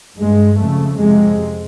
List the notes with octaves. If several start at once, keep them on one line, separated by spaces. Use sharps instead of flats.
G2 G#3
F2 C#3 A3
F2 C3 G#3